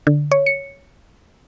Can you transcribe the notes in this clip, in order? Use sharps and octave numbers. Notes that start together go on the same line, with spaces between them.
D3
C#5
C#7